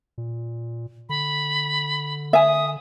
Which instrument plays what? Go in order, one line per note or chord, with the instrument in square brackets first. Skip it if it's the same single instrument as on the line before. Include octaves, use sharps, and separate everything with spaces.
[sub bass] A#2
[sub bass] D3 [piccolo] B5
[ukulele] E5 G#5 [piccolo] D#6